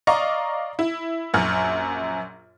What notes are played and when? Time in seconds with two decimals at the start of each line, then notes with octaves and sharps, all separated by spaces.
0.07 D5 D#5 F5 A#5 C#6
0.79 E4
1.34 A#1 F#2 F6